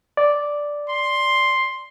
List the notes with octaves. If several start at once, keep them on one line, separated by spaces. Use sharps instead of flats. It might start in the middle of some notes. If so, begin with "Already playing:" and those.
D5
C6